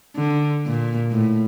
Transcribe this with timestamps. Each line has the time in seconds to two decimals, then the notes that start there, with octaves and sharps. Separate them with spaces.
0.16 D3
0.66 A#2
1.11 A2